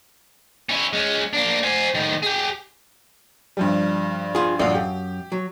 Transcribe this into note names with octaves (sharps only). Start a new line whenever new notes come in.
C#4 E4
G#3 C#4
A#3 D4
C5 G#5
A2 D#3
G4 G#4
G2 F3 G3
F4 G#4
A1 F#2 D4 F4 F5
G4
F#3